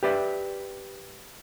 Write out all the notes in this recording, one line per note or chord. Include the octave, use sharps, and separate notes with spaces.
G4 B4 D5 E5